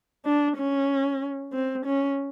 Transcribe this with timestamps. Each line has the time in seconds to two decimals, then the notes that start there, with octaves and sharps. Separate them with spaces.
0.26 D4
0.57 C#4
1.53 C4
1.86 C#4